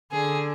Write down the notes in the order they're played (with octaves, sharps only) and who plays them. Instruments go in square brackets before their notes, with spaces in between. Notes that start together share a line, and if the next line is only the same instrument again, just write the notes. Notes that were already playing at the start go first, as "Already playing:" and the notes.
[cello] D3 [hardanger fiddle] G#4